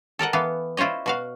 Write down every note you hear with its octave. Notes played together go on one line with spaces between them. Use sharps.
A4 A#4 D#5 F#5
E3 B3 F5
E4 F4 C5 C#5 D#5
B2 F#4 F5